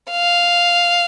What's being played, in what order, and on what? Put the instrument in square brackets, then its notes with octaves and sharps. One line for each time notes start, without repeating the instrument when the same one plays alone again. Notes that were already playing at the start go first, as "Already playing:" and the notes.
[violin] F5